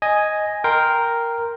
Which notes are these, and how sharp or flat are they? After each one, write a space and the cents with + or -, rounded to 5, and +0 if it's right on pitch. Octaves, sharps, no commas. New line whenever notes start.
D#5 +0 G#5 +0
A#4 +0 G5 +0 C6 +0